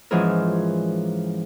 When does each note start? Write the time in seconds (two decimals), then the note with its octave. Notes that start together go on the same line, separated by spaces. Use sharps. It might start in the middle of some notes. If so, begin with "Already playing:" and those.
0.11 G#2 E3 F3 C#4 G#4 A#4